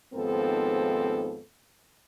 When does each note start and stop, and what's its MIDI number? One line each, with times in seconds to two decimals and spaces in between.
0.14 1.41 39
0.14 1.41 44
0.14 1.41 53
0.14 1.41 59
0.14 1.41 60
0.14 1.41 69